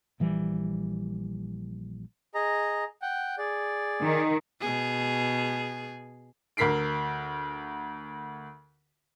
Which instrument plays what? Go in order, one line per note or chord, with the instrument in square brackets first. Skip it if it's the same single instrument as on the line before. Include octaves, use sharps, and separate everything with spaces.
[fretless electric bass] A#1 E3 G3
[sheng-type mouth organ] G#4 D#5 A#5
F#5 G5
G#4 D5
[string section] D#3
[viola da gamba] B2 G#4
[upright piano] D2 A#4 B6 C7 D7